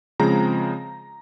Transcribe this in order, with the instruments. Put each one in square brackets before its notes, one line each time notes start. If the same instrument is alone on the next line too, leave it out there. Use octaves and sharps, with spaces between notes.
[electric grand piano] C#3 F3 G#3 C4 A#5